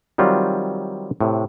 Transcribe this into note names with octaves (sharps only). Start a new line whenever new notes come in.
D#3 F#3 G3 C4 F4
A2 C3